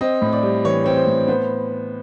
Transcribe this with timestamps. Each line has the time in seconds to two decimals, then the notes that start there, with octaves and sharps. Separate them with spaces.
0.01 C4 D#5
0.22 A2
0.33 D5
0.43 G3
0.65 E3 C#5
0.84 C4 C#5
0.96 C5
1.07 A2
1.28 B3 C5